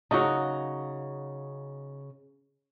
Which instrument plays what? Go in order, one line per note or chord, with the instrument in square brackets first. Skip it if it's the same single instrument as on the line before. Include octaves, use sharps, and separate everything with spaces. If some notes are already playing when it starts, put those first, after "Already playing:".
[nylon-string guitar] C#3 F#4 [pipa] F#3 A#3 D#4